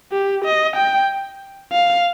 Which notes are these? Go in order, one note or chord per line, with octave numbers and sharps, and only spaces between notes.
G4
D#5
G5
F5